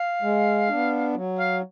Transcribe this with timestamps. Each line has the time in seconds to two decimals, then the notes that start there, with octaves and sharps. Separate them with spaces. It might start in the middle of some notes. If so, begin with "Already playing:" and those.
Already playing: F5
0.22 G#3
0.68 B3 D4
1.15 F#3
1.39 F5